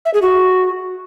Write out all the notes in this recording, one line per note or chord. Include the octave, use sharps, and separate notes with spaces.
E5
G#4
F#4